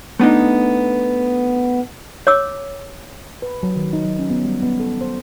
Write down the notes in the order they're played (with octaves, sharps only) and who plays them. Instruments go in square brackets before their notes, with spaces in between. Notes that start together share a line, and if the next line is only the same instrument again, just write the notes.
[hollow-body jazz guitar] A3 B3 D4 D#4
[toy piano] C#5 D6 E6
[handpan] B4
F#3
D#3
D#4
F#3
C#4
B3
G3
B3
A4
C5